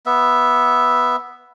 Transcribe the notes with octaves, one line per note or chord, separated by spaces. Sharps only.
B3 E5